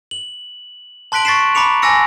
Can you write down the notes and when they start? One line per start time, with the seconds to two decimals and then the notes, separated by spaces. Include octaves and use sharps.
0.11 F#7
1.12 A5 C6 F#6 B6 D7 F#7
1.25 C#6 A6 B6 C7 E7
1.55 A#5 B5 D6 C#7 F7
1.82 G#5 A5 D6 E6 A#6 C#7